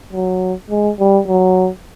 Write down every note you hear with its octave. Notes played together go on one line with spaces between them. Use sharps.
F#3
G#3
G3
F#3